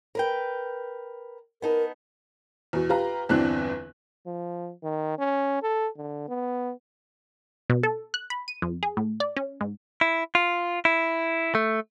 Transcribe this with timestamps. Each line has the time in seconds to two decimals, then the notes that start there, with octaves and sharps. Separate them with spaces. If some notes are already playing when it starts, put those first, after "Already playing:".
0.15 A#4 B4 G5
1.62 B3 D#4 A#4 A5
2.73 E2 B2
2.89 F4 G4 B4 F5 A#5
3.29 G1 E2 E3 C4 D4 F#6
4.27 F3
4.84 D#3
5.19 C#4
5.63 A4
5.98 D3
6.29 B3
7.70 B2
7.83 A4
8.14 F#6
8.30 B5
8.48 D#7
8.62 F2
8.83 G#4
8.97 A2
9.20 D5
9.36 C#4
9.61 G#2
10.01 E4
10.35 F4
10.85 E4
11.55 A3